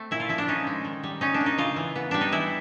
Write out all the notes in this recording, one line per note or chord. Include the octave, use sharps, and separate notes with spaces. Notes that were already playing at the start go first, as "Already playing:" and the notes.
Already playing: A3 C4
A#2 E4
F4
F3 E4
D4
C#4 D#4
G#3
D#3
G3
C#4 D#4
D4
A#3
D#4
C#3 F4
E3
B3
G3 D4
D#4
E3 E4